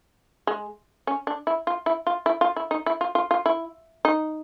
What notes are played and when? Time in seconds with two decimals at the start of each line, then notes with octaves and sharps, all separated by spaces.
0.47 G#3
1.07 C#4
1.27 D4
1.47 E4
1.67 F4
1.86 E4
2.07 F4
2.26 E4
2.41 F4
2.56 E4
2.71 D#4
2.86 E4
3.01 F4
3.15 F4
3.31 F4
3.46 E4
4.05 D#4